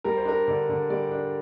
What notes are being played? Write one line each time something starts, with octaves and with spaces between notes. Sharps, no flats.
G3 A#4
C5
D4 A#4
D3 D5
D3
G3 D5
D4